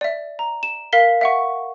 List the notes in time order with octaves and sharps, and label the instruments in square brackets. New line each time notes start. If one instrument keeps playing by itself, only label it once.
[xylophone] D5 E5
A#5
E7
A#4 F5 B6 G7
E5 F#5 C#6